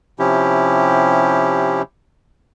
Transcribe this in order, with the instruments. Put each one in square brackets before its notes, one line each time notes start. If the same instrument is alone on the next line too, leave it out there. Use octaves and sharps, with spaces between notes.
[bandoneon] C3 F3 C#4 E4 G4